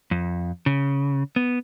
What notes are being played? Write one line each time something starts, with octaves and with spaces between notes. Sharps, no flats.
F2
C#3
B3